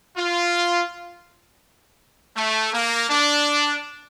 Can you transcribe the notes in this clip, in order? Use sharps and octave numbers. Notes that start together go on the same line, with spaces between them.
F4
A3
A#3
D4